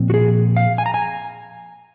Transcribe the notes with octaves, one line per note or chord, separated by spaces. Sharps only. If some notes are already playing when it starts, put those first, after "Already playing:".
Already playing: A#2 F3 C4
F#4
G#4
F5
G#5
A#5
G#5